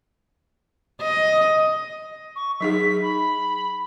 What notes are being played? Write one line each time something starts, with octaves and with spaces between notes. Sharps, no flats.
D#5
C#6
F#3 D#4 G#4 B6
B5